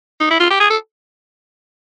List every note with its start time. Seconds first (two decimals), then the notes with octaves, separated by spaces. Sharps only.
0.21 D#4
0.31 E4
0.40 F4
0.50 G4
0.60 G#4
0.70 A4